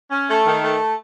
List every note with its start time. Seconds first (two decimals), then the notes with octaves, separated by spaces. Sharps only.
0.11 C#4
0.29 A3
0.45 D#3
0.62 A3